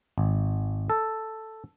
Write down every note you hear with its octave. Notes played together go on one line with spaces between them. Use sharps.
G#1
A4